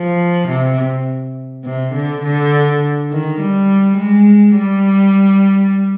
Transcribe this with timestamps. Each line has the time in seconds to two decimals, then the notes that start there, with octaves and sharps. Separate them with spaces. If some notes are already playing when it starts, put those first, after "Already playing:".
Already playing: F3
0.48 C3
1.65 C3
1.94 D3
2.23 D3
3.11 D#3
3.40 G3
3.98 G#3
4.57 G3